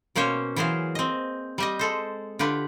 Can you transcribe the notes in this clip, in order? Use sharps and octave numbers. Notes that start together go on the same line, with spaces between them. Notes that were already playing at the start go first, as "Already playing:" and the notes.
B2 A#3 C#4 C5 C#5
E3 F#3 G#4 C5 F5
C4 D#5
G3 G4 D#5
G#3 A4 C5
D3 F4 G4 B4